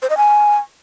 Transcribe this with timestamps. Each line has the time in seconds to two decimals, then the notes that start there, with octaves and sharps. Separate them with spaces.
0.02 C5
0.10 D#5
0.17 G#5